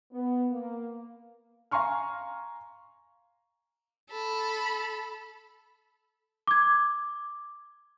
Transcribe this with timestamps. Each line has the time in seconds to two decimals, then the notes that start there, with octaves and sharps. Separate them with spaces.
0.12 B3
0.51 A#3
1.71 F5 G#5 A#5 C6 C#6 F6
4.11 A4 B5
6.47 D6 G#6